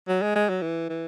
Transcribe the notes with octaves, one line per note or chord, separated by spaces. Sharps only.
F#3
G#3
G#3
F#3
E3
E3